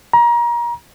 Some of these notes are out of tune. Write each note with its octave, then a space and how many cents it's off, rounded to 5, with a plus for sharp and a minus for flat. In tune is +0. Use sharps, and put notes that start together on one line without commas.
A#5 +30